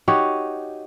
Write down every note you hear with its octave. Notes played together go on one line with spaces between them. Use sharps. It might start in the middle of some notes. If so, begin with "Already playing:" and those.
D#4 F#4 G4 C#5